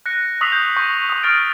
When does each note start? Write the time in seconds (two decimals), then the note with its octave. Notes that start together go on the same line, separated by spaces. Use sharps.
0.06 F#6 A#6 C#7
0.41 C#6 D#6 E6 B6 C7 F7
0.52 G6
0.77 C#6
1.09 C#6 D#6
1.23 D#6 F6 A6 D7